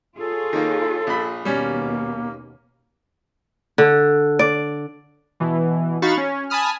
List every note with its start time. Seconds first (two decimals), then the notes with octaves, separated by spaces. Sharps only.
0.20 F4 G#4 A4 C#5
0.53 D#3 A#3
1.07 A#1 B5
1.45 D#2 B2 G3 A#3 C#4
3.78 D3
4.39 D5
5.40 B2 E3
6.02 D#4 F#4 F5 B5 C#6 A6
6.18 C#4
6.50 G#5 A5 B5 D#6 F6